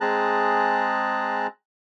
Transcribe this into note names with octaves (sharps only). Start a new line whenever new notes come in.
G#3 C4 G#4 A5 A#5 F#6